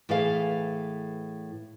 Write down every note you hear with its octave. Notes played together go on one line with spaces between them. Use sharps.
A2 E3 G#4 A4 F5